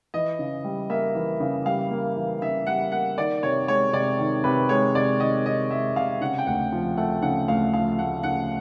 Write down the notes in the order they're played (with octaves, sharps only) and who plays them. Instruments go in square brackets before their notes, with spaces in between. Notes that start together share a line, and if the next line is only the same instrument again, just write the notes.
[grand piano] E3 [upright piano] D#5
[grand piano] C#3
G3
[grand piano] A#3 [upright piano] E5
[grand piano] E3
C#3
[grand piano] G3 [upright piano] F5
[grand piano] A#3
E3
[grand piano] C#3 [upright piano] E5
[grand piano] G3 [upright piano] F#5
[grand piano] A#3 [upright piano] F#5
[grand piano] D#3 [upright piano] D5
[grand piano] C3 [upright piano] C#5
[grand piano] G#3 [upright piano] C#5
[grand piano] C3 [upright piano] D5
[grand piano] D#3
[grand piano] C3 [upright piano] B4
[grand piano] G#3 [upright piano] C#5
[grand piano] C3 [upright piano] D5
[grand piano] D#3 [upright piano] D#5
[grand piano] C3 [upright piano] D#5
[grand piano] G#3 [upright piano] E5
[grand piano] C3 [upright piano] F5
[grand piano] C#3 [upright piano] F#5
[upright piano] G5
[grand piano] D2 [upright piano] F#5
[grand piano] F3
[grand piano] A3 [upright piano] F#5
[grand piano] C#3 [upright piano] F#5
[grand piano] D2 [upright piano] F5
[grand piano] F3 [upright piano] F5
[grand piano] A3 [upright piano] F#5
[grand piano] C#3 [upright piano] F#5